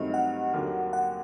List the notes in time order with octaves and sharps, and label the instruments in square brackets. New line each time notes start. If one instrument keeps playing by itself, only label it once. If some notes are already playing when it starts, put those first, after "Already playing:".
Already playing: [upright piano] G2 D#3 F#3 A3 C4 [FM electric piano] D#5
[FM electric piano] F#5
[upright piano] D#2 D3 F#3 A#3
[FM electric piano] F#5